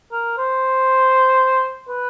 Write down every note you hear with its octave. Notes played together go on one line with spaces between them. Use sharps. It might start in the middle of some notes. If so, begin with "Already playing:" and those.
A#4
C5
B4